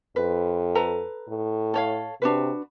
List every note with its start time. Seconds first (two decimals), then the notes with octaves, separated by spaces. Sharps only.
0.16 F2 B4
0.75 A4 B4 A#5
1.28 A2
1.74 A4 C#5 F5
2.22 C3 D4 F#4 B4